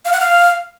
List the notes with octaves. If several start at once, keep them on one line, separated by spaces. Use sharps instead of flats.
F5
F#5
F5